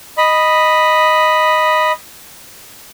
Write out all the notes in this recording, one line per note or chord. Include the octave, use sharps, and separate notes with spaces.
D#5 B5